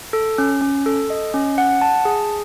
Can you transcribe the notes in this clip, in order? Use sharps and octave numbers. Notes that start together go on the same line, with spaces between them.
A4
C#4
C#4
A4
D#5
C#4
F#5
A5
G#4